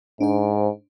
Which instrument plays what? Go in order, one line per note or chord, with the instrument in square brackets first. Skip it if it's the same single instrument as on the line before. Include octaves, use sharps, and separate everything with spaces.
[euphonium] G#2 [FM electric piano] D4 C5